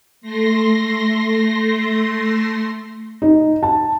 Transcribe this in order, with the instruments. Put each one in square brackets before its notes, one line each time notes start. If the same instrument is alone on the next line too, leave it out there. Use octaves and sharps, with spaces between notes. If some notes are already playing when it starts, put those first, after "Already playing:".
[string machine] A3 C6 A#6
[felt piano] D#4
A5